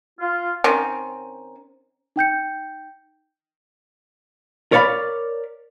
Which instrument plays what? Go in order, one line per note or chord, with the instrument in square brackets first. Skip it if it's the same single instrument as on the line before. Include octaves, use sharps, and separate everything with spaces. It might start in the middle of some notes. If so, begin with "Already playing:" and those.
[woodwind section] F4
[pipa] D#3 C4 C#4
[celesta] D#4 G5 G6 C#7
[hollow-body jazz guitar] A#4 C#5 D5 F5 B5